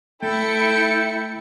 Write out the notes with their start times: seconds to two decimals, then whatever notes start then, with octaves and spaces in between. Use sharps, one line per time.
0.23 A3 E4 A4 G5 C#7